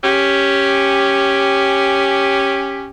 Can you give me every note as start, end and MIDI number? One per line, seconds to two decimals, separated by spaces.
0.04 2.91 61
0.04 2.91 67